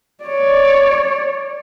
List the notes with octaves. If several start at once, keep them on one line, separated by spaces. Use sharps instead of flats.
C#5 D5